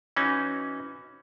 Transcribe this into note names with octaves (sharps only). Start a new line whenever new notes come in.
E3 C#4 D#4 F#4